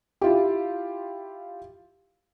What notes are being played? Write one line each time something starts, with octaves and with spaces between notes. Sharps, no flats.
E4 F4 G4